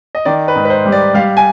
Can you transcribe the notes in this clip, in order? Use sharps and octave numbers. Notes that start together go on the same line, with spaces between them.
D#5
D#3 D5
B4
G#2
B4
C5
G3
D5
G3 F5
G#5